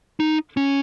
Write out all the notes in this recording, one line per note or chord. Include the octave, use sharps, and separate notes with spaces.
D#4
C#4